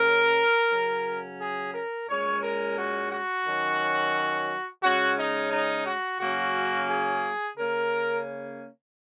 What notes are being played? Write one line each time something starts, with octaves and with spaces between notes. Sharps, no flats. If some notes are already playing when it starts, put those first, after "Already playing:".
Already playing: C#3 A#3 C#4 A#4
C#3 F#3 C#4
G#4
A#4
A#2 G#3 C#4 C#5
A#4
F#4
F#4
D#3 F#3 C#4
C#3 G#3 C#4 F#4
D#4
D#4
F#4
C#3 F#3 A#3 C#4 F#4
G#4
C#3 A#3 C#4 A#4